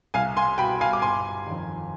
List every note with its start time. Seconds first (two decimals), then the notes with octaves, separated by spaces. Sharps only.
0.14 C2 F5 G#5
0.37 G#5 C6
0.58 B2 G5 B5
0.81 F5 G#5
0.93 D6
1.02 G1 G#5 C6
1.46 F2 D#3